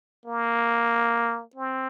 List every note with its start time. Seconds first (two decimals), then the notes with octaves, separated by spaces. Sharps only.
0.26 A#3
1.56 C4